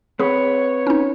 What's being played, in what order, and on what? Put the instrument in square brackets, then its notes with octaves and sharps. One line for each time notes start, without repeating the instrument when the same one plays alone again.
[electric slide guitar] C4 B4 [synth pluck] G#4 [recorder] C#5
[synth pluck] C#4 D#4